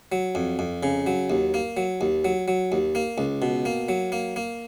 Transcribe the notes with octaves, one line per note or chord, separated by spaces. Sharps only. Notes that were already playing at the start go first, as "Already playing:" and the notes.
F#3
F2
F2
C#3
F#3
D#2
A#3
F#3
D#2
F#3
F#3
D#2
A#3
C#2
B2
A#3
F#3
A#3
A#3